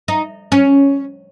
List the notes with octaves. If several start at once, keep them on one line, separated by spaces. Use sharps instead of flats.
D#4
C#4